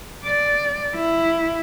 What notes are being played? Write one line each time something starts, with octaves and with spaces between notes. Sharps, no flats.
D5
E4